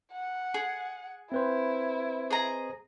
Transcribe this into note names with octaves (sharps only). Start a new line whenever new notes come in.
F#5
G#4
C4 E4 B4 C5
G#4 D#5 A#5